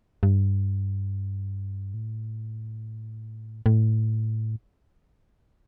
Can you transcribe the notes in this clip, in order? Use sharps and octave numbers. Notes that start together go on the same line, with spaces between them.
G2
A2
A2